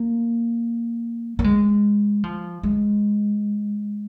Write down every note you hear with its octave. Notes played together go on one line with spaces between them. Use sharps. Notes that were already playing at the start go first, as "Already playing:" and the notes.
Already playing: A#3
A#3
G#3
F3
G#3